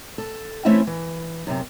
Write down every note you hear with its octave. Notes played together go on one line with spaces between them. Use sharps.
A4
E3 A3 C4 C#4 E4 E5
E3
F#2 C3